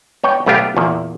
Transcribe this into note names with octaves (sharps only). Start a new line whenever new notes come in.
B3 C#5 G5
B1 A3 B3 G4 F5
E2 A#2 A#3